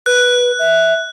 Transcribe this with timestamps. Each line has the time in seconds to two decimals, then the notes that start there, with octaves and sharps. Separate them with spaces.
0.06 B4 F#6
0.59 E5